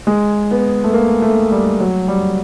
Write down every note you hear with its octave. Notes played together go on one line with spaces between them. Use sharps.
G#3
B3
A3
A#3
A3
G3
F#3
G3